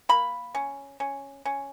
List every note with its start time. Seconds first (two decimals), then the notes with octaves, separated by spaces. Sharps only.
0.09 A#3 B5
0.55 C#4
1.00 C#4
1.45 C#4